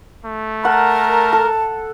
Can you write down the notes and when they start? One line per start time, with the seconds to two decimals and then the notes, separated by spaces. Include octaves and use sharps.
0.24 A3
0.65 A#4 F#5 A5
1.33 A4